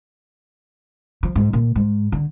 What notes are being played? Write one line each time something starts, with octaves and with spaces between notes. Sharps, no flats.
F3
G#2
A#2
G#2
D3